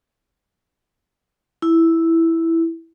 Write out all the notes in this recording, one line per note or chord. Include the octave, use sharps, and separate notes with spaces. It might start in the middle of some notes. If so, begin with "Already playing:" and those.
E4